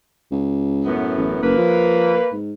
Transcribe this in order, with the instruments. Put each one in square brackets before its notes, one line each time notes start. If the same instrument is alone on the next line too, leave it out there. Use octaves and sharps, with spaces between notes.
[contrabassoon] C#2
[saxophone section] F#2 A2 B3
[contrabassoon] A1
[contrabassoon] F#1 [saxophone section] A#3 B4
[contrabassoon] F3
G#2